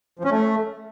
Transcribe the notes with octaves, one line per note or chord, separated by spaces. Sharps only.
F3
C#4
A3